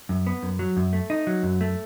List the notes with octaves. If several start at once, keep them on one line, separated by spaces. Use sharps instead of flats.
F#2
B3
F#2
F#3
F#2
A3
D#4
F#3
F#2
A3